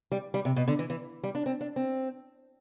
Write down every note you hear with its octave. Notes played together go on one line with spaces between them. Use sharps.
G3
G3
C3
B2
D3
E3
E3
G3
D4
C4
D4
C4